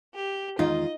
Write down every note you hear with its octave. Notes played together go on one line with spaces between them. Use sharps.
G4
E2 D#3 G#3 D#4 F4 D#5